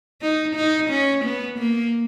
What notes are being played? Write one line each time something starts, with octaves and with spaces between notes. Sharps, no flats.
D#4
D#4
C#4
B3
A#3